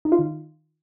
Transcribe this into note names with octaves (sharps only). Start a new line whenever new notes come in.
D#4
F4
D#3